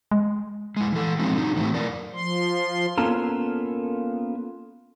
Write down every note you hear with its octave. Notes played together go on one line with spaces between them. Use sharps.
G#3
G#3 E4
E3 A4
F3 F#3 G#3 C4 C#4 D#4
D3 F#3 D#4
A2 E3 F#3 G3 A3 C4
F#2 A#4 D5
F3 C6
A#3 B3 C#4 F4 A4 A#4